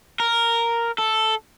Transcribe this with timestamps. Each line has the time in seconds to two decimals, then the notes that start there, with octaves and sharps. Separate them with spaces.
0.20 A#4
0.98 A4